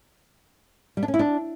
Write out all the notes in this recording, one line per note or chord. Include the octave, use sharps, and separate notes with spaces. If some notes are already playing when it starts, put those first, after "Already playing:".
G3
D4
C#4
E4
D4